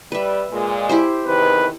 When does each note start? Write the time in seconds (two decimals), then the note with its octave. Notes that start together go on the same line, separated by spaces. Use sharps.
0.12 G3 B4 E5
0.51 A#2 G#3
0.89 E4 G4 C5
1.26 E2 C3 D#3 B4